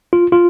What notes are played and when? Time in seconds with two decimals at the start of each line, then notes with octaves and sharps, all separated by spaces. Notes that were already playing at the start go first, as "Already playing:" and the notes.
0.13 F4
0.32 F4